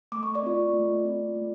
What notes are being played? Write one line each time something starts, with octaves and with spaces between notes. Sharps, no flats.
A3 D6
C#6
D5 D6
C4 F4
A3
C4 F4
A3